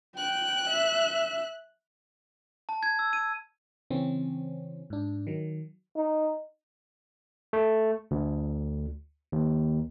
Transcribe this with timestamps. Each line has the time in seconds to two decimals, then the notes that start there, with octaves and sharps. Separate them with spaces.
0.17 G5 F#6
0.71 E5
2.69 A5
2.83 G#6
2.99 E6
3.13 D#7
3.90 C#3 E3 C4 C#4
4.90 G#2 D4
5.27 D#3 F#3
5.96 D#4
7.53 A3
8.11 D2
9.32 D#2